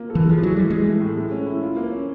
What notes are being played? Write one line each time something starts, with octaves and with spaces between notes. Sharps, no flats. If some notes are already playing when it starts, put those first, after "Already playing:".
Already playing: A#3 F4
A4
E3
F3 G#3
E3 F#3
E3 G3
E3 G#3
A3
A2
G#3
C#4
E4
F4
A#3
C#4